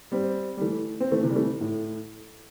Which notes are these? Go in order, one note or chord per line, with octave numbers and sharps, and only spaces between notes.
G3 C4
G3
E3 A3
C4
E3 A3
C3 E3
G3
E3 A3
A2